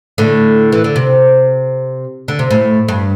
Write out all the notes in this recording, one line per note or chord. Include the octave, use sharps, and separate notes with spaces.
A2 D3
E3
D3
C3
D3
C3
A2
G2